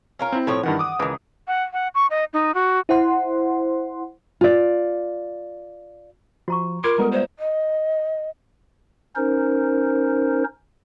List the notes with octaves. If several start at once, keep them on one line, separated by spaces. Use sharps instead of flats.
C#4 F4 A#4
C4 E4
A2 F3 C#5
G2 D#3 E3 F#5
D6 D#6
C#2 D#3 E3
F#5
F#5
C#6
D#5
D#4
F#4
E4 C5 F#5 C6
F4 D5
F3 F#4 A#5 C#6
F4 A#4 C6 D6 G#6
G3 G#3 B3 A4 B4 A#5
B4 C5 D5 E5
D#5
C#4 D#4 A#4 C5